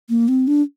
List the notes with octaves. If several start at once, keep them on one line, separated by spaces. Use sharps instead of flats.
A#3
C4
D4